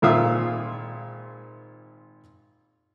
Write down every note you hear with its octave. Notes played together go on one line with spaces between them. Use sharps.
G#1 A#2 F4 E5 F5 D#6